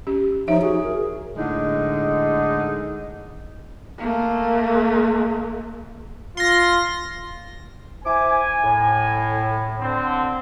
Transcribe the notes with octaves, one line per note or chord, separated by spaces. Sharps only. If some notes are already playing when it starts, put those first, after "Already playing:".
C#4 G4
F3 D#4 C#5 E5
F#4 G#4
A#4
A2 D3 G#3 D#4
A3 A#3
F4 C6 A#6
E4 C5 G#5 D6
A2
D3 C4